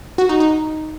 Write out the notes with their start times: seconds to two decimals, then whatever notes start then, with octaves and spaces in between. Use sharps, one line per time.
0.18 F#4
0.29 D#4
0.40 D#4